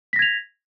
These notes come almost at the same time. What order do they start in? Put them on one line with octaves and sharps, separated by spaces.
B6 A#6 G#6 F7